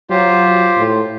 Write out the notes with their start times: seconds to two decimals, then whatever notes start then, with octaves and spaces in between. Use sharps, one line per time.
0.10 F#3 F4 G4 C5
0.77 A2